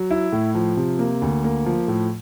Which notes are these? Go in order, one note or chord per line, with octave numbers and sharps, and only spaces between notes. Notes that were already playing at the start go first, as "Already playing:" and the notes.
Already playing: F#3
E4
A2
F3
C3
A#3
D2
A#3
F3
A2